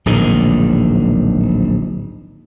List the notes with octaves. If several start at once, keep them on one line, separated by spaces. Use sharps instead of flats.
D1 A#1 G#2 D#3